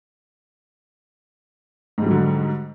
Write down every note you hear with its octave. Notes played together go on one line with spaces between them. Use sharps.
G#2 D3 F#3 G3